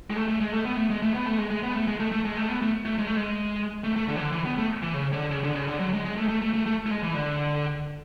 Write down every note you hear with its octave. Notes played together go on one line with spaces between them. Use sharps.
G#3
A3
A3
G#3
A3
B3
A3
G#3
A3
B3
A3
G#3
G#3
B3
A3
G#3
A3
A3
G#3
A3
B3
A3
A3
G#3
A3
G#3
A3
A3
D3
E3
D3
E3
B3
A3
E3
C#3
D3
C#3
D3
C#3
D3
F#3
G#3
G#3
A3
A3
A3
A3
A3
A3
G#3
E3
D3